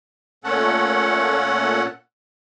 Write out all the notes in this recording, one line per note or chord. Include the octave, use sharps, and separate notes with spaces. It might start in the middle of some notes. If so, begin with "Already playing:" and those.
A#2 A3 C#4 A4 F#5